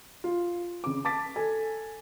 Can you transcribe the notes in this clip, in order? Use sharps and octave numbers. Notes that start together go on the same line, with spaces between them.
F4
C#3 D6
A5 D6 A6 B6
A4 G#5